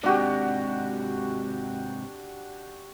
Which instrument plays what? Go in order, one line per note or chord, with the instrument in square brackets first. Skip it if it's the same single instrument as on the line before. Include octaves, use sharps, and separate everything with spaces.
[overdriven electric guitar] G#2 C3 [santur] D4 F#4 G4